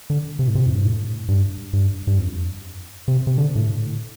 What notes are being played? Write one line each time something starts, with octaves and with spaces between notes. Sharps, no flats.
D3
C3
A2
C3
F2
G2
A2
G2
G2
G2
F2
C3
C3
D3
A2